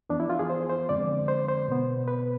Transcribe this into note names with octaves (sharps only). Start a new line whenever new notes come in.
F2 E3 B3 D4
E4
F4
G#4
C5
C5
F2 D3 G#3 C4 D5
C5
C5
B2 B3
B4